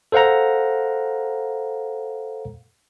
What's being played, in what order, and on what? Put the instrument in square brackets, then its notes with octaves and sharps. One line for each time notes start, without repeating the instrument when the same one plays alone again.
[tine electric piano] A4 C5 F5 F#5 A#5